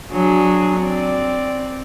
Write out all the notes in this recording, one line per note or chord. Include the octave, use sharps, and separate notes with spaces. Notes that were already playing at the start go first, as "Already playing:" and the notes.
F#3 D4 G#4
C4 D5